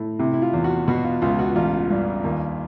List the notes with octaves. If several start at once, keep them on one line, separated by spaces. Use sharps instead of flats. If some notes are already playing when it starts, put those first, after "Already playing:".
Already playing: A2
C3 E4
E4
F4
E2
F#4
B2 F#4
F4
C#2 F4
F#4
A1 F4
G2
D#2